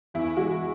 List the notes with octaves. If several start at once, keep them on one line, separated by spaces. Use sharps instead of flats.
E2 E4
E3 G#3 F#4